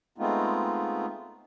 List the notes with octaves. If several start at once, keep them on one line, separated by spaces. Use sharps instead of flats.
G#3 A3 B3 C4 D#4 F4